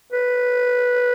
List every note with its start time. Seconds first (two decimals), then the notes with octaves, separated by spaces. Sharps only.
0.13 B4